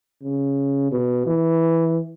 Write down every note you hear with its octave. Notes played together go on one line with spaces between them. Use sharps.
C#3
B2
E3